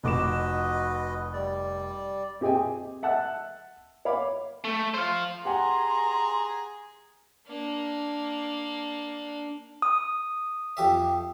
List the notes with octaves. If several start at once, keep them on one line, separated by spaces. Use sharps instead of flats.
F1 F#4 B4 D#5 D6 E7
G3 D5
C4 G4 G#4 D#5 G5 G#5
E5 F#5 A5 E6 F#6
C#5 F5 B5 D6
A3
C5 F5
G4 G#4 F#5 G#5 A#5 C6
A#3 D4
D#6
F2 G4 E5